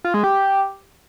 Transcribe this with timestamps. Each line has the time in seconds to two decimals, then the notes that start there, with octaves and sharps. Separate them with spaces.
0.04 F4
0.14 G#3
0.24 G4